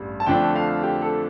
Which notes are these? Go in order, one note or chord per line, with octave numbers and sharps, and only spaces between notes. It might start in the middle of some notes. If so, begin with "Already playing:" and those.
Already playing: A1 G2 G3
A5
F2 D3 F3 A3 D4 G5
F5
G4
A4